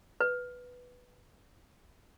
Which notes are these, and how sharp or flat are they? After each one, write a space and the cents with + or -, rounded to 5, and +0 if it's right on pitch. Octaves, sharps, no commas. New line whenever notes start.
B4 +0